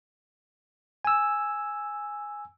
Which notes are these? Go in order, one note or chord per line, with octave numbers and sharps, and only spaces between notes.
G#5 E6